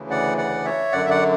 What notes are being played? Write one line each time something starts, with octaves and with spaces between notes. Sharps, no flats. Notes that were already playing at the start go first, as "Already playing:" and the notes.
Already playing: D2 C#3 E3
D5 F#5
D5 F#5
C#5 E5
F#2 D3 D5 F#5
E5
D5 F#5